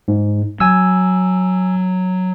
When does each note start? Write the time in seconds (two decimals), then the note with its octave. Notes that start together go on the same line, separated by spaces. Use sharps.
0.08 G#2
0.60 F#3 G#5 E6